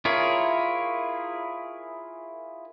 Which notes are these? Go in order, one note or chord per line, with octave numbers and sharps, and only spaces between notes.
E4 F4 G#4 A#4 C#5